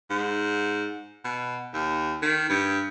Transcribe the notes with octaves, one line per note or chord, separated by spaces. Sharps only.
G#2
B2
D#2
D#3
G2